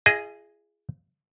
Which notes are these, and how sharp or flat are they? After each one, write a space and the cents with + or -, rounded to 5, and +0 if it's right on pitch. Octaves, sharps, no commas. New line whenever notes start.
F4 -45 G#4 +0 D#5 +0